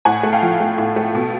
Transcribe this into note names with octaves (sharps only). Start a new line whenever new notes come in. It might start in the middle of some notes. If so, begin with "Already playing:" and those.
A2 F#5 G#5
A3
F5 G5
F3
A3
A2
A3
B2